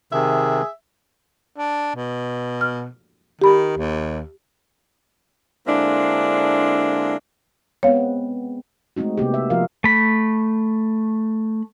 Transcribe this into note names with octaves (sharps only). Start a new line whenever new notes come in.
C3 D#3 G#4 E5
D4
B2
F6
D#3 G4 B5
D#2
D3 G#3 A#3 C4 D4 E4
G#3 B3 C4 C#5 F5
G#3 A3 C4 D#4 F#4
C3 A#3 B3 G4
E5
F3 F4 F#4 A#4 F5
A3 B5